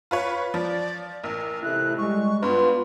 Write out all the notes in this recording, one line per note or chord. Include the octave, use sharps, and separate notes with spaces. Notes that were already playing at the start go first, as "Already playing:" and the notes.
F4 B4 C#5
F3 D5
A1 A#4
C3 A3 E4 F#6
G3 G#3 C#6
G2 B3 F4 B4 C6